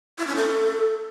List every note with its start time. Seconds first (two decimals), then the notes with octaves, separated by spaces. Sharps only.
0.18 E4
0.27 C#4
0.36 A4